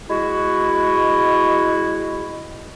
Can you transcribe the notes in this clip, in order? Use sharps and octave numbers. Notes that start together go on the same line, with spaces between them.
G#3 E4 F#4